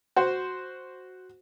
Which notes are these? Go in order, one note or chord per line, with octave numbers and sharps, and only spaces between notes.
F#4 C5